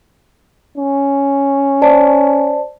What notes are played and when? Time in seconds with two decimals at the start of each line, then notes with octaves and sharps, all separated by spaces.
0.78 C#4
1.82 C5 D5 A5